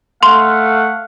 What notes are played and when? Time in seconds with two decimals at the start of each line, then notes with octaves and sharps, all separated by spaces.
0.23 A3 F5 F#5 C6